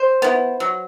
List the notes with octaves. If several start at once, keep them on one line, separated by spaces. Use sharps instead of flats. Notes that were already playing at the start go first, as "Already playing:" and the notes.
Already playing: C5
B3 E4
F#3